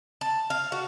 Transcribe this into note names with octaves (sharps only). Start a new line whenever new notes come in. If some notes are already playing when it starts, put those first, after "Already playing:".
A5
F5
F#4